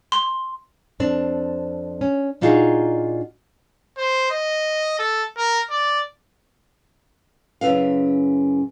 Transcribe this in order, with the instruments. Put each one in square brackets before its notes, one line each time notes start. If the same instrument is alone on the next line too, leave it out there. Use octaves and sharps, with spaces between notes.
[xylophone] C6
[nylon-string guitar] F2 C4 D4
C#4
A#2 D4 D#4 F4 F#4 G#4
[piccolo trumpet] C5
D#5
A4
A#4
D5
[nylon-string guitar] F#2 C#3 E4 B4 F5